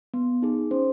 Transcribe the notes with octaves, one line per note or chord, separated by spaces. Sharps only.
B3
D#4 G#4
C#4 C5